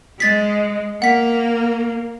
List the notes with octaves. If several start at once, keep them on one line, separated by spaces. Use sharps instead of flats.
G#3 A6 B6
A#3 F#5 B6